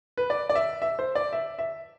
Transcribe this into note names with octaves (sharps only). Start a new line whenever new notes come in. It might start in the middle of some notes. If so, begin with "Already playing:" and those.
B4
D5
D5
E5
E5
C5
D5
E5
E5